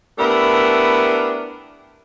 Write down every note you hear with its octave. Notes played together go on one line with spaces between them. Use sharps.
A3 B3 D4 E4 G4 A#4